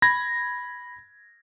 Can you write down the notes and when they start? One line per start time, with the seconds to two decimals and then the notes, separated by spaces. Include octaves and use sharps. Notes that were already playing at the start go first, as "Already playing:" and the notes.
0.02 B5 G#6 A#6